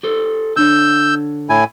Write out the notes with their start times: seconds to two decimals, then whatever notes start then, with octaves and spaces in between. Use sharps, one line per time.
0.03 G4 A4 C5
0.56 D3 D4 C#5 E6 G6
1.50 A2 E4 G#5